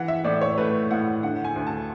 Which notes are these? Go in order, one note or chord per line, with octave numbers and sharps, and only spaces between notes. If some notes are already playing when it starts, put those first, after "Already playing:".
Already playing: E3 F#5
E5
A2 D5
C#5
A3 B4
A2 F#5
D3 F#5
G#5
D2
A5